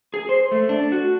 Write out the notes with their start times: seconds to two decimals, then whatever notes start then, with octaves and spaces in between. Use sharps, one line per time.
0.14 G#4
0.29 C5
0.52 A3
0.69 D4
0.92 F#4